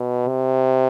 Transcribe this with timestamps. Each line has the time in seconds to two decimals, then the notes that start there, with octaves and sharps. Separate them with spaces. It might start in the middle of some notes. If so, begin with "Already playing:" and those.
Already playing: B2
0.27 C3